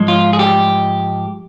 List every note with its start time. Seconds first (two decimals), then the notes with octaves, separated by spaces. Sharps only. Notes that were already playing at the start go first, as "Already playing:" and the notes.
Already playing: G#2 F3 G#3
0.08 F4
0.33 G#4
0.39 G4